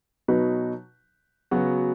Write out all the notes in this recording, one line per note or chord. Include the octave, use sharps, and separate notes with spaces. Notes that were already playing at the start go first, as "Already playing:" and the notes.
B2 F#3 D#4 B4
C#3 F#3 B3 F#4